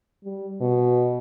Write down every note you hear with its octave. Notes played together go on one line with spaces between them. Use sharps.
G3
B2